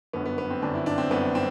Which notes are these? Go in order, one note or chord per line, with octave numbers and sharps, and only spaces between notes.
G1 F#2 D3 B3
B3
B3
C4
G1 F#2 D3 D4
E4
D4
C4
G1 F#2 D3 B3
C4